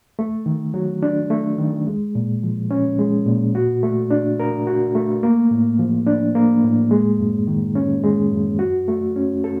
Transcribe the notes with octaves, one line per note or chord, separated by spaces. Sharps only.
A3
D#3
F#3
D4
A3
D#3
G#3
A#2
F3
C#4
G#3
A#2
F#4
A3
D4
A#4
F#4
A3
A#3
A2
F3
D4
A#3
A2
G#3
F#2
D#3
C#4
G#3
F#2
F#4
A3
C#4
A4